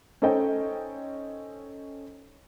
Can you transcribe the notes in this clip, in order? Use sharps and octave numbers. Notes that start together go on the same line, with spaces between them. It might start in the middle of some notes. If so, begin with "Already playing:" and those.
C#4 D#4 A4 C5 D#5 G5